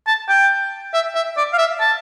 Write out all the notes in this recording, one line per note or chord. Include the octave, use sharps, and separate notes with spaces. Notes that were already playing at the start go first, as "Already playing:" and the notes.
A5
G5
E5
E5
D5
F5
E5
A5